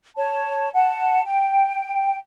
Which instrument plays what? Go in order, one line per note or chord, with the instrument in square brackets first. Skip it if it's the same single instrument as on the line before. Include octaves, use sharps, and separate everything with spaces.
[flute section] C#5 A5
F#5 A5
G5